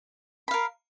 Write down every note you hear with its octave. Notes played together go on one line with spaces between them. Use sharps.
A#4 F5 B5